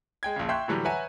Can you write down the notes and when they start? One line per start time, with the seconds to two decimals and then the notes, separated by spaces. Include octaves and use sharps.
0.23 G#3 G5 G#6
0.36 A#1 C#3
0.49 E5 G5 C6 C#6 F#6 G6
0.68 A2 D3 E3 F#3 G3
0.85 B4 C#5 E5 F#5 G#5 A#5